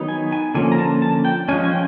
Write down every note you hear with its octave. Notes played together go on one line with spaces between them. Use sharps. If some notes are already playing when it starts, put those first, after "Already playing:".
Already playing: D#3 F#3 B3 D#4
G#5
G#5
D3 F3 A#3 C#4 G#5
A#5
A5
A5
G5
F3 G#3 C#4 G#5
G#5
G5